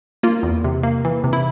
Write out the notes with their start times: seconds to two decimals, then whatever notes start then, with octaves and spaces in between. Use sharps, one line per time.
0.23 A#3 F4
0.43 E2
0.64 C3
0.83 A#3
1.05 E3
1.24 C3
1.33 E4